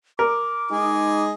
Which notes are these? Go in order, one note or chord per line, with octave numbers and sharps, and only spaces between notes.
A#4 D6
G#3 D#4 G#4 D#5 G#5